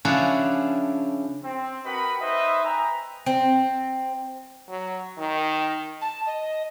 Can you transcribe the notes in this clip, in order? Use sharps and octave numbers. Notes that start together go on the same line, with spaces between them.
C#3 F3 C#4 D4 E4 F#4
C4
F#4 A#4 B4 D#5 G5 B5
D#4 B4 C5 D#5 E5
B4 E5 G5 G#5 A#5
C4
F#3
D#3
A5
D#5